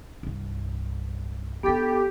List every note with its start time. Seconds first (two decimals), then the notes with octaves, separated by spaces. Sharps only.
0.23 C2 G2
1.63 B3 D4 D#4 G4 A4